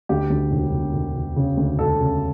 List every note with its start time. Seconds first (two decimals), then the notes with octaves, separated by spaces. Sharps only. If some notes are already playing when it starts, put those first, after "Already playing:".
0.09 D2 G4
0.30 D2
0.51 E1
0.72 E1
0.94 E1
1.15 E1
1.36 C#3
1.57 D2
1.78 E1 A4
2.00 C#3